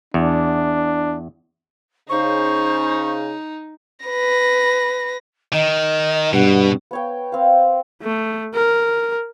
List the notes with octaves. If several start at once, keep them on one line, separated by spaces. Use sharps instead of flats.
E2 D4
C#3 D#4 C5 C#6
B4 A#6
D#3 D#5
G2 B2 F#5
B3 C#5 G5
C4 F5
A3
A#4